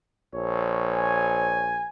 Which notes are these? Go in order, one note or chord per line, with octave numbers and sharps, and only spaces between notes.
A#1 C#5
G#5